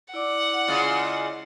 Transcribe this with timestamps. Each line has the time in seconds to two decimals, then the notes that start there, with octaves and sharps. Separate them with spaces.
0.14 E4 D5 F#5 D6
0.68 C#3 G#3 F4